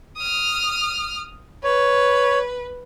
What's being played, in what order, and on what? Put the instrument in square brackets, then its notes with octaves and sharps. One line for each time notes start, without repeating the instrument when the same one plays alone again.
[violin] D#6 F6
[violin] B4 [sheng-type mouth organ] C#5